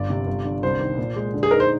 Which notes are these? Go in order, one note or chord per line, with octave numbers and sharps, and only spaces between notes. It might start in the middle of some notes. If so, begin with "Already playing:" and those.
Already playing: G1 D5
C3
G1
D3
C2 C5
D#3
A#2
G#3
D3
G#4
D#4 A#4
C5